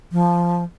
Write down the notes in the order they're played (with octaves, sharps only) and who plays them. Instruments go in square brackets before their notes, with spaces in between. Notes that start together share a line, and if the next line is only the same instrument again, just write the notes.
[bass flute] F3